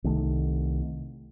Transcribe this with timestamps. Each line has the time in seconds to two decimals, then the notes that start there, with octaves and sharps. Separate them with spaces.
0.04 C2 D#3 A3